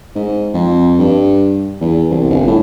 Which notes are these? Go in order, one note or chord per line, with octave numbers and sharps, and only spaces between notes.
G#2
F2
G2
E2
C2
G1
A2